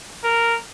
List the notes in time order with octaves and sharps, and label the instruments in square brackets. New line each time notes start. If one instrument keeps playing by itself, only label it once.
[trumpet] A#4